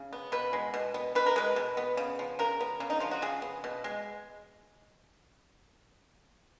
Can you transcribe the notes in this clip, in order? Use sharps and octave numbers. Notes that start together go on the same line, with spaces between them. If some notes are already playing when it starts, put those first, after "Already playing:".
Already playing: C#3
B3
B2 B4
G#3
B2
B3
B2 B4
A#4
G#3 B4
B2
B3
C#3
F3
C#3 A#4
B3
C#3
D#4
F3 F4
F#4
C#3 G#4
B3
B2
G#3